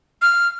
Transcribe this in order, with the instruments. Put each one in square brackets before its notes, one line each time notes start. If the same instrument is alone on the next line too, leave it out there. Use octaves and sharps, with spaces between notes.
[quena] F6